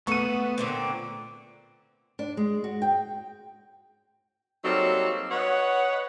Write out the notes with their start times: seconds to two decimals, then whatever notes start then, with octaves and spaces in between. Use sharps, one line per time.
0.07 A3 B3 A4 F#5 C#6 D#7
0.58 A#2 D3 C4
2.19 D4
2.37 G#3
2.64 F#4
2.82 G5
4.64 F#3 G3 A#3 C4 D#4 A4
5.31 B4 C#5 D#5 F#5